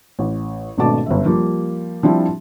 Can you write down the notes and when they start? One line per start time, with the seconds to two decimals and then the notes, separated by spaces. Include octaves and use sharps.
0.19 A1
0.78 G#1 B2 A3 D4 A5 D6
1.06 G1 F#2 E5
1.26 F3 G3 A#3 G4
2.03 F3 G3 C4 D4 E4 F4